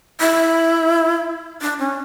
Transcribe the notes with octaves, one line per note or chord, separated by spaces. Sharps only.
E4
D4
C#4